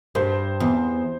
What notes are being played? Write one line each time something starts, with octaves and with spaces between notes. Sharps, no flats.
G2 C5
E2